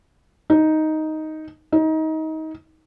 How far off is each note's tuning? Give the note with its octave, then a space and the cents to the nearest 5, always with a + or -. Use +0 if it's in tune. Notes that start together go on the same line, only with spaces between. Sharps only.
D#4 +5
D#4 +25